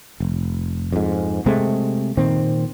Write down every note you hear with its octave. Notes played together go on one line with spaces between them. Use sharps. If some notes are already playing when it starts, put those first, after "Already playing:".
F1
F2 G#2
C3 G#3 A3 C4
A#2 D#3 C4